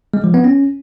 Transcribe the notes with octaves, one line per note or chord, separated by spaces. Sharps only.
G#3
F3
B3
C#4